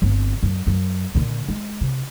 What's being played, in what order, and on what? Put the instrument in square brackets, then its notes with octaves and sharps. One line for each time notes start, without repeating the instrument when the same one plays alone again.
[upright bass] G1 C4
F#2
F#2
A#2 D3
G#3
C3